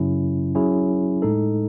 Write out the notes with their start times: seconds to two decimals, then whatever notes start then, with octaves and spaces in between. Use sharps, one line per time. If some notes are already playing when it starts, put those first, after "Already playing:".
Already playing: F#2 C#3 F#3 C#4 E4
0.55 F#3 C#4 E4 G#4
1.22 A2 G#3 D#4 A4